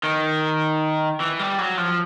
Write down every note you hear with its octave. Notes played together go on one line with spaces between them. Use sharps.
D#3
E3
G3
F#3
F3